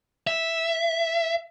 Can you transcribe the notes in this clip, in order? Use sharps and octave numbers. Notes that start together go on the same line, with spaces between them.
E5